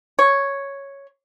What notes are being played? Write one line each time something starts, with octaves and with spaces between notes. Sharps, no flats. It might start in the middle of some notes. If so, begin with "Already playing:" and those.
C#5